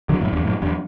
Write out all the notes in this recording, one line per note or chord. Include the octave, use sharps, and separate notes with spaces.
D3 F#3
F#2 A2
E2 G2
F#2 A2
E2 G2